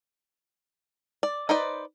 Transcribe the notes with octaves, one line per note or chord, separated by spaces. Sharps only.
D5
D#4 B4 C5 D5